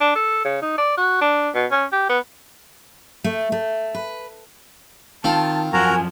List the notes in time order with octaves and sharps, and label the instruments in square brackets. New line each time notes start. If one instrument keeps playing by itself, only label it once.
[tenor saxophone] D4
A4
C#3
D#4
D5
F#4
D4
B2
C#4
G4
B3
[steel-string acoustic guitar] A3
A3
B4
[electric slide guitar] D#3 [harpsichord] C4 F4 [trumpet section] A5
[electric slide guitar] F#2 F3 [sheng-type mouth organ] F#4 A#4 A#5 [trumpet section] G#5